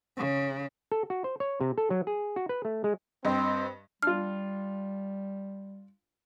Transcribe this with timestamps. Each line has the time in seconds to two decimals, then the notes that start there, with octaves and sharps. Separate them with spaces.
0.17 C#3
0.92 A4
1.10 F#4
1.24 C5
1.40 C#5
1.61 C3
1.78 A4
1.90 F#3
2.07 G#4
2.36 F#4
2.49 B4
2.65 A3
2.84 G#3
3.25 G2 C4 D#5
4.03 G3 D4 F4 F6